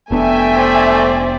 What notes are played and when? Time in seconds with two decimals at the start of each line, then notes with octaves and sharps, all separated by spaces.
0.11 F1 A3 B3 D4 E5 G5 G#5
0.55 C5 D5